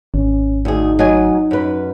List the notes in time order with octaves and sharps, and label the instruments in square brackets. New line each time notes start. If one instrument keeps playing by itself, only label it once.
[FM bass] G#1 [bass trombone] C#4
[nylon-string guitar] D2 G#4 [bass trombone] D#4
[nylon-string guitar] F#3 D#5 G#5
F#2 B4